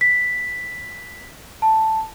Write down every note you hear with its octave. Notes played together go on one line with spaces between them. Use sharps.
B6
A5